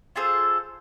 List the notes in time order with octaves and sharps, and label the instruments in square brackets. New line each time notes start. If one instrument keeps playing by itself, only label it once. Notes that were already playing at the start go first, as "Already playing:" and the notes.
[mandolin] F4 G#4 A4 C5